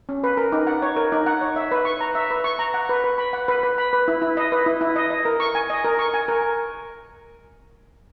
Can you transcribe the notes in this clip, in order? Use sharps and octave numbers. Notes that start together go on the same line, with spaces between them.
C#4
B4
A#4
D#4
F#5
C#5
A#4
D#4
F#5
C#5
E5
B4
C#6
A#5
E5
B4
C#6
A#5
F#5
B4
B4
B5
F#5
B4
B4
B5
B4
E4
E4
D#5
B4
E4
E4
D#5
D#5
A#4
C#6
G#5
D#5
A#4
C#6
G#5
A#4